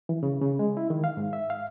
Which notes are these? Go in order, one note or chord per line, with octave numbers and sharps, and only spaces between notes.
E3
C#3
C#3
G#3
E4
D#3
F5
G#2
E5
F5